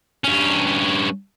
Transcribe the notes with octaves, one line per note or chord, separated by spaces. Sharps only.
G2 C#4